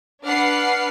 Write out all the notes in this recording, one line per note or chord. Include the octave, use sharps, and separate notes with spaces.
D4 B4 F#5 F6 C7